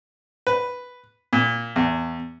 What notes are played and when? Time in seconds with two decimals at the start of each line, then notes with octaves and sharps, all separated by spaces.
0.47 B4
1.33 A#2
1.76 E2